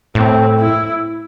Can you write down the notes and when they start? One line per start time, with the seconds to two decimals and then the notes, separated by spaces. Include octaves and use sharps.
0.15 A2 C4
0.59 E4